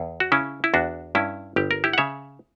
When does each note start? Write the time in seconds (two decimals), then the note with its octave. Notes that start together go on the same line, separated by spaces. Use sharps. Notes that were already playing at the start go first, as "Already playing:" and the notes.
Already playing: E2
0.20 F#4
0.32 C#3 C#4 E4
0.64 E4
0.74 E2 D4 F#4
1.15 G2 C#4 E4
1.56 G1 G4
1.71 A#4
1.84 E4 G4
1.93 F#5
1.98 C#3 C#5 E5